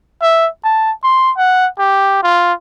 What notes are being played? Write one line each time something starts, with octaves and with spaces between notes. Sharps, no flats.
E5
A5
C6
F#5
G4
F4